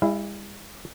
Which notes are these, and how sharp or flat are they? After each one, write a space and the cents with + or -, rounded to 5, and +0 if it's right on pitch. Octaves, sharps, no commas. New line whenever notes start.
G#3 -45 E4 +0 F5 -30